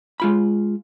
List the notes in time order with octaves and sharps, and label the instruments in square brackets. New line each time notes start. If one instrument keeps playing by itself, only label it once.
[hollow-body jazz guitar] G#3 F4 B5